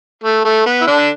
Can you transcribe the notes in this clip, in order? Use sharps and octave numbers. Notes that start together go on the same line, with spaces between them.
A3
A3
B3
E4
D3 D4